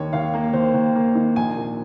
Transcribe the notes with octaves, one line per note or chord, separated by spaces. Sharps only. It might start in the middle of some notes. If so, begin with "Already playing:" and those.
Already playing: D#2 D#3 C#5
D#2 F5
A#3
D#2 C5
D#2
A#3
D#3
A#1 G#5
A#2